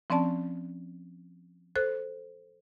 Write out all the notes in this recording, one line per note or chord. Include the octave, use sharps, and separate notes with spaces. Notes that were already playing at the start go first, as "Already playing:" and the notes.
F3 C4 C#4 D5 A5
A4 C5 F#6